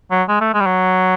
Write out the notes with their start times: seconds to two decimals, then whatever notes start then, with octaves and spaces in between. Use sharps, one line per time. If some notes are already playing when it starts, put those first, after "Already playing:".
0.11 F#3
0.28 G#3
0.40 A3
0.54 G#3
0.60 G3
0.66 F#3